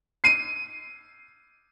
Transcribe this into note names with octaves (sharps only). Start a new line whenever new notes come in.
C7 D#7